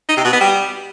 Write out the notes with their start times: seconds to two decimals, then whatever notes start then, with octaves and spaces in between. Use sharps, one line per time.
0.09 D#4
0.17 C3
0.25 B2
0.33 B3
0.41 G3